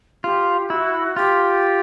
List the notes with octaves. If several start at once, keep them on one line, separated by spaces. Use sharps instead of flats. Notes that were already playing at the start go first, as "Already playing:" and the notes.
F4 G4
E4 F#4
F4 G4